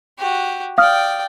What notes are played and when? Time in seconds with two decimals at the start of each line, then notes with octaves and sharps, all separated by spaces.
0.18 F#4 G4
0.78 D5 F5 G5 D#6 F6